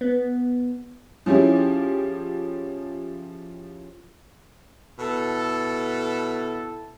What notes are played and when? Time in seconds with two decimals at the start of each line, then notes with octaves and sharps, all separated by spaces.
0.01 B3
1.26 F3 C#4 E4 G4 G#4
4.99 B2 E4 A4